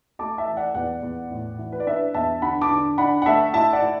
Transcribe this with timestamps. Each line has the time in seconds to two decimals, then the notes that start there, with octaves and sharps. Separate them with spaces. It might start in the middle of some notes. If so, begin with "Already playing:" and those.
0.19 A3 A5 D6
0.38 E5 A5
0.47 E3
0.57 D5 F#5
0.75 E2 D5 F#5
1.02 E2
1.31 A2
1.59 E3
1.72 B4
1.80 D5
1.87 D4 B4 E5
2.14 E2 E5 A5
2.42 D3 F#5 B5
2.61 A5 D6
2.71 D3
2.98 D4 F#5 B5
3.22 F#5
3.26 A3 E5 A5
3.54 E4 E5 A5
3.73 D5 F#5
3.82 E4